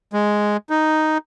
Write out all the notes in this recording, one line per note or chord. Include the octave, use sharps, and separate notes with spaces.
G#3
D#4